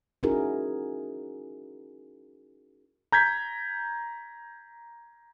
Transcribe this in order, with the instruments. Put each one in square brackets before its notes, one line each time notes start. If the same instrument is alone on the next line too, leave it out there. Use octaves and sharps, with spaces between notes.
[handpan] C#4 D#4 E4 F#4 G#4 A#4
[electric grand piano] A#5 G6 G#6 B6